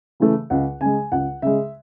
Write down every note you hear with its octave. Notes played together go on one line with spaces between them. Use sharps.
C#3 E3 A3
C#2 F#5
C#3 G#3 G#5
C#2 F#5
C#3 G#3 E5